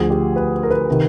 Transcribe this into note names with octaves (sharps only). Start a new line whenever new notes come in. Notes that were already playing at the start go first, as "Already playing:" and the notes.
Already playing: D2 D3 F3 G#4
G4
B4
A#4
B4
C3 D#3